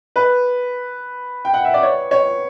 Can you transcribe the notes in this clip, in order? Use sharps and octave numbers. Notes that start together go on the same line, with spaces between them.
B4
G5
F#5
E5
D5
C#5
C#5